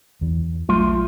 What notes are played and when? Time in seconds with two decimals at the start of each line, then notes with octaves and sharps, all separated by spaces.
0.21 E2 E3
0.69 A#1 F#3 G3 A3 F4 C6